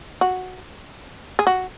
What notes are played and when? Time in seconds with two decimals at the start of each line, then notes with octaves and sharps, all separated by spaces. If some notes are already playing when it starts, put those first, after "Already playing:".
0.21 F#4
1.39 G#4
1.47 F#4